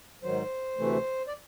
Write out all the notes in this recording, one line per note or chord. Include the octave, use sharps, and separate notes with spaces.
G#2 D#3 F#3 C5
D2 C3 E3 A3
D5